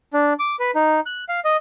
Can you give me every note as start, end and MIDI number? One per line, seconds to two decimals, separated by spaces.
0.13 0.33 62
0.39 0.56 86
0.60 0.71 71
0.75 1.00 63
1.06 1.24 90
1.29 1.40 77
1.45 1.57 75